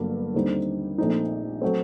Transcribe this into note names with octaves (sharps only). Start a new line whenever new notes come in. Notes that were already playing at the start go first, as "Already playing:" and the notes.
Already playing: G1 G2 F#3 A#3
D#2 D3 G3 C4 D#4
A#1 A#2 A3 C4 D#4
F#3 A3 C4